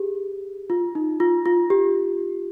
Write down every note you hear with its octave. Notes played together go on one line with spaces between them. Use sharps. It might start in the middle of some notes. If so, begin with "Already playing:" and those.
Already playing: G4 G#4
F4
D#4
F4
F4
G4